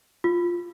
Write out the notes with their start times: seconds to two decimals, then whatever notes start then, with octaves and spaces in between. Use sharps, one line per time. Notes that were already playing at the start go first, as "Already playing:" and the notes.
0.24 F4